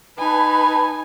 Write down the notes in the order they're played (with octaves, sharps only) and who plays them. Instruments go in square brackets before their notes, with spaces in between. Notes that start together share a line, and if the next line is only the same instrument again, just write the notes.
[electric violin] D#4 G#5 [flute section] B4 A5 B5